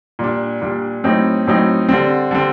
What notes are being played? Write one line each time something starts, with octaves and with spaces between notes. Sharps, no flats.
A#2 G3 D4
A#2 G3 D4
A2 F#3 C4 D#4
A2 F#3 C4 D#4
D3 G3 C4
D3 G3 C4